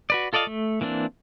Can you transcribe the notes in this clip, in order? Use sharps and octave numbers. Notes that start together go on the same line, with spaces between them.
F#4 B4 D5
F4 A4 D5 D#5 F5
A3
E3 A#3 C4 D4